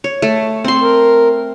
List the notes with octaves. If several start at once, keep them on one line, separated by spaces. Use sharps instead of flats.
C#5
A3
C4 C6
A#4